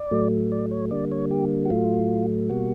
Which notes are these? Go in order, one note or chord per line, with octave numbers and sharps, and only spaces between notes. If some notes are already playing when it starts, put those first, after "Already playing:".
Already playing: D5
A2 F#3 A3
D5
C#5
D3 G3 A#3 D5
C#5
G4
F#4
A2 F#3 A3 F4
B2 G3 A#3 F#4